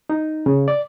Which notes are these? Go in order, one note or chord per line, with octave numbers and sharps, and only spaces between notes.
D#4
C#3
D5